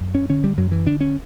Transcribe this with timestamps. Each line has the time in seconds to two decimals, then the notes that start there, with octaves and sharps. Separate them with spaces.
0.01 F#2
0.15 C#4
0.29 D3 C#4
0.44 G3
0.57 F#2 F#3
0.72 E3
0.86 D3 D4
1.01 C#4